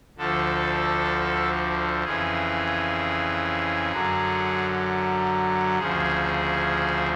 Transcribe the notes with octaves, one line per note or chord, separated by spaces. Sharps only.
D2 D3 F3 A4
F2 C#3 E3 G#4
F#2 D3 F#3
D2 C#3 F3 G#4